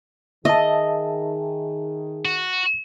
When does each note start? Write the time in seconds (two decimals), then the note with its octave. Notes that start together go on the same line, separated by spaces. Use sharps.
0.45 D#3 G#4 D#5 E5 A5
2.25 F#4